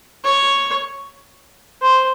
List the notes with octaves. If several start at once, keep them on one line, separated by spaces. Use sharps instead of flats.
C#5
C5